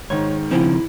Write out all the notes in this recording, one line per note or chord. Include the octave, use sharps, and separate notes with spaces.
G#2 D#3 C#5
C#3 F3 C4 E4